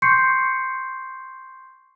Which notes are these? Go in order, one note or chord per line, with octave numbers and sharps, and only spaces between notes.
C6 C#6 G6 C7 C#7